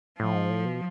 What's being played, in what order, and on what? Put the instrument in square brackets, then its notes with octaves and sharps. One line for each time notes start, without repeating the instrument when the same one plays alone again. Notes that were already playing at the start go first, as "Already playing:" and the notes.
[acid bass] A2 [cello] F3
[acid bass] G#2
A2
B2